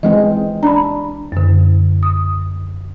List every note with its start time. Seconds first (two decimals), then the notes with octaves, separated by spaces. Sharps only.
0.03 E3 G#3 C4 D#5
0.63 D4 A#5 B5
1.32 F#2 D3
2.03 D#6